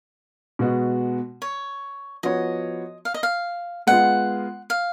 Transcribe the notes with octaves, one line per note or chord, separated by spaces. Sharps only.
B2 G#3 B3 F#4
C#5
F3 B3 F#4 C#5 D#5
F5
D#5
F5
G#3 B3 F4 F#5
F5